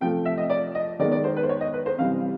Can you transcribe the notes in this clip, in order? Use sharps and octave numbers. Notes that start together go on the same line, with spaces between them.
C3 F3 A3 G5
E5
D#5
D5
D#5
D#3 G#3 B3 D5
D5
C5
B4
C5
C#5
D#5
B4
C5
C3 E3 G3 F5